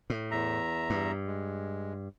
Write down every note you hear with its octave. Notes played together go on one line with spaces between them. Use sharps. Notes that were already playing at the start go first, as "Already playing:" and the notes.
A2
E2 E5 A#5
G2
G#3